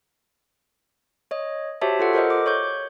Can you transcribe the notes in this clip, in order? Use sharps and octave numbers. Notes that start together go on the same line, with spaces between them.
C#5 D#5
F#4 G4 C5 C#5 E5 A5
F4 A4 F#5
A4 A#4 C5 D#5
D6
C#5 C#6 G6